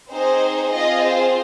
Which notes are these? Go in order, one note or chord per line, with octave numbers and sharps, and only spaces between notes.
C4 D#4 G#4 C5
C4 F4 G#4 D#5
C5